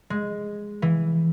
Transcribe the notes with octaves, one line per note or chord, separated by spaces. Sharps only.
G#3
E3